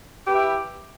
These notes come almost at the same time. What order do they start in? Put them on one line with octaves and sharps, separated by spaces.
G4 B4 E5 E4